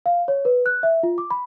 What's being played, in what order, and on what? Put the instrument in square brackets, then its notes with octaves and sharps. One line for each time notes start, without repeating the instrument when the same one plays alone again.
[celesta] F5
C#5
B4
F#6
E5
F4
D6
B5